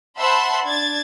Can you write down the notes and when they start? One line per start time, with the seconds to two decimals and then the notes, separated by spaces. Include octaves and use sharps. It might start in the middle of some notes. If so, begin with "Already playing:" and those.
0.18 C5 E5 F#5 A5 B5 C6
0.65 D4 G#6 A6